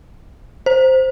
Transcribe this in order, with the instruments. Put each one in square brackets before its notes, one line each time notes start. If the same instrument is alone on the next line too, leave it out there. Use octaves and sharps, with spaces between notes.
[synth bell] C5